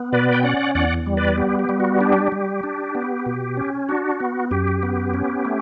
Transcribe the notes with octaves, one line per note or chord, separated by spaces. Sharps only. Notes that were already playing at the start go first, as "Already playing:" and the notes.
Already playing: B3
B2 B4 D5
G5
C#4 D5 F#5
E2 D5 F#5
G3
B4 D5
B3 G4
G4
G3
F#4
D4 G4
G3
D4
B3
B2
C#4
D4 F#4
B3
F#2 G4
B3
C#4
A3